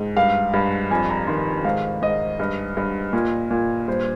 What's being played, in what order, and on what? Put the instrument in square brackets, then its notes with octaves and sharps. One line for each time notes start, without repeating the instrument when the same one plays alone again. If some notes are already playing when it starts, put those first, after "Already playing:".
Already playing: [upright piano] G#2
G2 F5
G2
F2 G#5
A#5
D#3 C6
G#2 F5
G#2 D#5
G2
G2
A#2
A#2
G2 C5